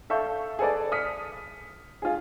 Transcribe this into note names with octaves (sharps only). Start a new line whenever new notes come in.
A4 E5 F5 C#6 G6
G#4 A4 B4 D5
D#6 F6 B6 C#7
F4 G#4